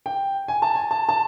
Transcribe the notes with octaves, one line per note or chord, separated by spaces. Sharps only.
G5
G#5
A5
G#5
A5
A5